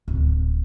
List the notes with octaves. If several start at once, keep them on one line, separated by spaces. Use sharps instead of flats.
D1